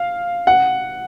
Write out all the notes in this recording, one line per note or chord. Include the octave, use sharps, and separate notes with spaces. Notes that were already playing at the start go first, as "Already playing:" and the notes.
Already playing: F5
F#5